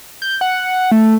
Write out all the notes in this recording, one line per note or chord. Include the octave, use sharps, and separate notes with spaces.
G6
F#5
A3